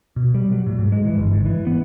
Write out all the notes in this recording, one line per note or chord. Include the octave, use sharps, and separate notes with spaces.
B2
G3
F#3
A2
G#2
G#3
E3
G1
G#2
E3
B3